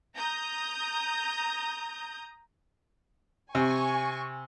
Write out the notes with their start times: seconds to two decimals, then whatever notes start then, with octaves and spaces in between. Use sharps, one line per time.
0.14 A#5 D#6 G6
3.55 C3 G#5 C#6